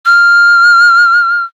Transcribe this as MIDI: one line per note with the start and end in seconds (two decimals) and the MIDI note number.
0.06 1.44 89